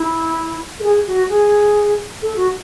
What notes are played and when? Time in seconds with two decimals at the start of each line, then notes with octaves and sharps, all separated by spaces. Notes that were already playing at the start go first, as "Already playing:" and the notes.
Already playing: E4
0.80 A4
0.83 G#4
1.07 F#4
1.29 G#4
2.22 A4
2.36 F#4